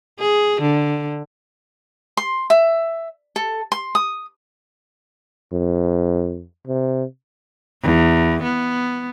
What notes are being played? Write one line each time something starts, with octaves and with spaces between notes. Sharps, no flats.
G#4
D3
C6
E5
A4
C6
D#6
F2
C3
E2
B3